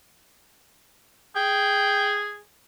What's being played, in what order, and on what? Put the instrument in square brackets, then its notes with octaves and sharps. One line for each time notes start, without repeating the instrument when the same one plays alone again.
[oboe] G#4 [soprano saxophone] G5